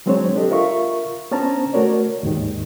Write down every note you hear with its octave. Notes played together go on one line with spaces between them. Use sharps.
F#3 G#3 C4 D4 C5 C#5
D4 G4 A4 D#5
F4 A#4 E5 F5 C#6
B3 C#4 D4 C5 A5 A#5
A3 F#4 A#4 C#5 D5
D#2 G#2 D#3